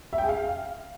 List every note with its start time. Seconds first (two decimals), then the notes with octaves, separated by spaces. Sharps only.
0.13 E5
0.18 G5
0.24 G#4
0.29 F5